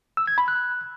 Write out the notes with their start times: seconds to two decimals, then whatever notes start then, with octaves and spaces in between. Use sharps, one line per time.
0.17 E6
0.27 G#6
0.38 B5
0.48 F#6